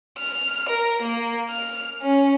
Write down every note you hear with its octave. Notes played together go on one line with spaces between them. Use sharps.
F6
A#4
A#3
F6
C#4